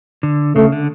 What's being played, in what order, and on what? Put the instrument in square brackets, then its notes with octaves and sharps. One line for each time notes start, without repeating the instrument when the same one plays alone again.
[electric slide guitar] D3
[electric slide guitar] C#3 [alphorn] A3
[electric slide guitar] D3